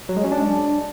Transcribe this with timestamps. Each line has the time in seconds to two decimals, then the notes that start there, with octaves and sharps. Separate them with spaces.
0.09 F#3
0.17 G#3
0.24 C#4
0.32 D4